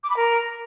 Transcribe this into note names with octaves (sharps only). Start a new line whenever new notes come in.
D6
B5
A#4